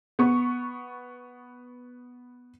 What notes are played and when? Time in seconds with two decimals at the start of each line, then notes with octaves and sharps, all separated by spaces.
0.19 B3 C#6